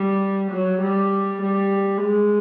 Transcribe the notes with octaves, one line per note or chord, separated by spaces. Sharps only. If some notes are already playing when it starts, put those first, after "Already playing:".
Already playing: G3
F#3
G3
G3
G#3